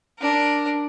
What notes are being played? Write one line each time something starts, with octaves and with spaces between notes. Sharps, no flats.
D4 A#4